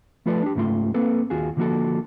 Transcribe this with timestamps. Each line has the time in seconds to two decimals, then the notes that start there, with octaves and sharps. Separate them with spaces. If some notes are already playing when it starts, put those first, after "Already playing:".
0.26 F3 A3 F4 A4 B4 D5
0.43 D4 G4
0.55 C#2 G#2 C#3 A3 F4 C6
0.94 A#3 C4 A4 B4
1.30 D#2 F4 F#4 G#4
1.57 D3 F3 A#3 E4 F#4 A4